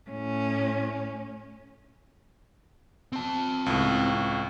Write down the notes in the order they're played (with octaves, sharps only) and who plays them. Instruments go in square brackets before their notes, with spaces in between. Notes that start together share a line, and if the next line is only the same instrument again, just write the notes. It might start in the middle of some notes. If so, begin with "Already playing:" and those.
[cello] A2 C#4
[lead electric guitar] C4 A5
[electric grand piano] C#2 A2